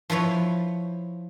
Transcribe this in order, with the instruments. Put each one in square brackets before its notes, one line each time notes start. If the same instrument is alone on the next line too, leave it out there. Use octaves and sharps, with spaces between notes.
[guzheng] F3 E4 B4 C#5